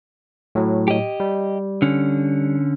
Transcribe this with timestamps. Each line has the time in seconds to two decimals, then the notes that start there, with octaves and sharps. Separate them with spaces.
0.55 A2 F#3
0.88 G4 D#5
1.20 G3
1.82 D3 C#4